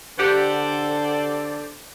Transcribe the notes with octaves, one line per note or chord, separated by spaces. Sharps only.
D3 G4 A4 C5 D5 F#5